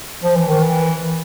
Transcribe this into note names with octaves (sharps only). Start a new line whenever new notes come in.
F3
E3
D#3
E3